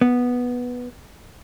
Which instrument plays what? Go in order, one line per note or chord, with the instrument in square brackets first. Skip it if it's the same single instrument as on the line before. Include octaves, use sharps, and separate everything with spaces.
[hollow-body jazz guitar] B3